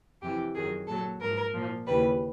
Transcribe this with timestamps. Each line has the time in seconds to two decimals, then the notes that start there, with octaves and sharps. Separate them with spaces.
0.22 F2 C3 E3 G4
0.55 F#2 D#3 F#3 G#4
0.88 A#2 F#3 A4
1.21 G#2 F3 A#4
1.54 A#2 F3
1.87 D#2 C#3 E3 G3 B4